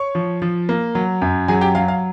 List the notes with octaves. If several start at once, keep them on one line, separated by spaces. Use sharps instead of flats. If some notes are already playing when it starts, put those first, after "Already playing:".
Already playing: C#5 C#6
F3
F3
A#3
F#3
F#2
F#3 G#4 G#5
G4 G5
F#3 F5
F5